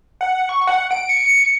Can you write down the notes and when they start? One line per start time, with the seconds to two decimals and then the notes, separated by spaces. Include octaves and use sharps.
0.21 F#5
0.49 C#6
0.67 F#5
0.91 D7
1.09 C#7